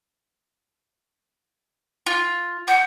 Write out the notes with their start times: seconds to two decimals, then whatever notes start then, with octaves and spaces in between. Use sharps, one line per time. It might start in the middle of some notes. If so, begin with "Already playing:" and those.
2.06 F4
2.68 F#5 G6